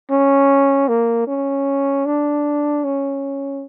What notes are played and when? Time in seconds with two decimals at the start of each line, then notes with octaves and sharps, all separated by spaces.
0.11 C#4
0.89 A#3
1.27 C#4
2.06 D4
2.84 C#4